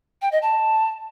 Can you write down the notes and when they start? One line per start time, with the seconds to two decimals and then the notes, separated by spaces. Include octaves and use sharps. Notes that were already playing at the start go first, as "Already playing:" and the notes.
0.22 G5
0.32 D#5
0.42 A5